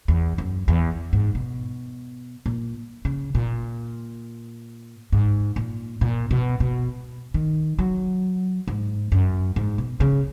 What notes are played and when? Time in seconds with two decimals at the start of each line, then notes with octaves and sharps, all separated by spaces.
0.08 E2
0.38 F#2
0.68 E2
1.13 G#2
1.35 B2
2.46 A#2
3.05 C#3
3.35 A#2
5.12 G#2
5.56 A#2
6.01 A#2
6.31 B2
6.60 B2
7.34 D#3
7.79 F#3
8.68 G#2
9.12 F#2
9.56 G#2
9.78 B2
10.00 C#3